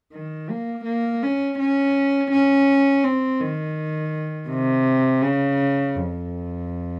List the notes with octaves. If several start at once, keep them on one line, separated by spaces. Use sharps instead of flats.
D#3
A#3
A#3
C#4
C#4
C#4
C4
D#3
C3
C#3
F2